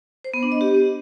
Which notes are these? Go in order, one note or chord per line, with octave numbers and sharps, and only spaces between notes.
C5
B3
D4
D#5
G4